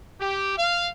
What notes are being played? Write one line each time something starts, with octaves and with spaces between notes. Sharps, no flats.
G4
F5